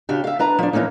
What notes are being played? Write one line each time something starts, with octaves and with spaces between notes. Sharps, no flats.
C#3 D4 F#4 G4
E5 F5
D4 B4 A#5
F3 D4
E3 F#3 A#3 C#4 D#4